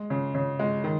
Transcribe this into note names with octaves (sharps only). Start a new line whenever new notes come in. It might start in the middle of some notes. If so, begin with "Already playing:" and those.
Already playing: G#3
C#3
C#3
G#3
D#3